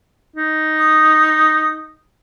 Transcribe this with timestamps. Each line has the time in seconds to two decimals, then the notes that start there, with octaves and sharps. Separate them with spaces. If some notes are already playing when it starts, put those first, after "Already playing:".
0.36 D#4
0.79 D#6